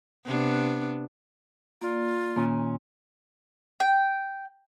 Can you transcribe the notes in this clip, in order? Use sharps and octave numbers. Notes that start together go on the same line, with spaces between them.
C3 B3 D4
A#3 F4 D5
D#2 A#2 A#3 C#4
G5